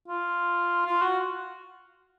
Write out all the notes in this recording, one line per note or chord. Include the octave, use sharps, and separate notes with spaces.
F4
F4
F#4